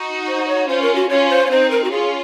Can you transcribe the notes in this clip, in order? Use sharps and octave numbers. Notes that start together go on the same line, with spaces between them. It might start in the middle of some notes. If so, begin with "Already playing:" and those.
Already playing: D#4 F#4
C5
C#5
C#4 F4 C5
A#4
F#4
C#4 F4 C#5
C5
C#5
C4 D#4 C5
A#4
F#4
C#4 F4 G#4